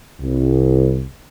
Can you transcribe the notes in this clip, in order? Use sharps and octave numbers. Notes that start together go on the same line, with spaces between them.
C2